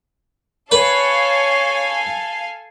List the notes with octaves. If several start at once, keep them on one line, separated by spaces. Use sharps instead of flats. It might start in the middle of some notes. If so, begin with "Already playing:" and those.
A4 B4 C#5 F5 G#5